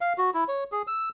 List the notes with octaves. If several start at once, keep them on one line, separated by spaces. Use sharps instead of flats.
F5
F#4
E4
C#5
G#4
E6